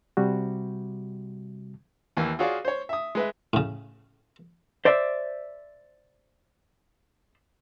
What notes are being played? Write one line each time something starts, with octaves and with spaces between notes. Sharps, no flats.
C3 G3 F#4
D#2 E3 A#3
F4 F#4 G#4 C#5 D5 F5
C5 C#5
E5 D#6
G#3 B4 E5
A2 C#3
C5 D5 E5